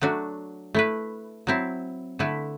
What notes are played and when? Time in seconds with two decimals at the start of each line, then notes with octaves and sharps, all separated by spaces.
0.01 F#3 A3 D4 F#4
0.74 A3 E4 B4
1.47 F#3 C4 E4
2.19 D3 A3 E4 B4